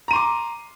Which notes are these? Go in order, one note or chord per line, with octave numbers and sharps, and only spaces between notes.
A#5 C6 D6 D#7